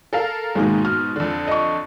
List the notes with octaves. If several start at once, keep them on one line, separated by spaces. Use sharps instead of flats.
A4 A#4 F5
G#2 B2 D#3 G#3 A#3 D#4
F6
F2 D3
D#5 C#6